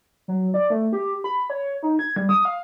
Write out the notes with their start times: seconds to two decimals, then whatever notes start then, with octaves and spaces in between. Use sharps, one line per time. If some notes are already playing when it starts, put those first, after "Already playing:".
0.28 F#3
0.54 D5
0.70 A3
0.93 G4
1.24 B5
1.50 C#5
1.83 D#4
1.99 G#6
2.16 G3
2.29 D#6
2.45 F5